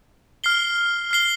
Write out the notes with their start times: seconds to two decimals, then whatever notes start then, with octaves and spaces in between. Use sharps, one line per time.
0.44 F6 C7 G7
1.11 F6 C7 G7